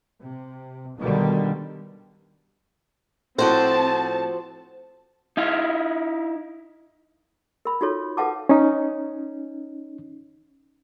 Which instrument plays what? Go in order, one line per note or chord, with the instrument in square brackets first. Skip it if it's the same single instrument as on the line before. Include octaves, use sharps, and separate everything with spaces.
[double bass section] C3
B2 D3 D#3 G3
[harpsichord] A2 [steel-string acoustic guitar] F3 F#4 C5 [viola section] C4 A5
[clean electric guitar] D#4 E4 F5
[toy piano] A#4 B5
D#4 F4 F#4 A4 C#5
A4 B4 F5 F#5 A5 D6
[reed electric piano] C#4 D#4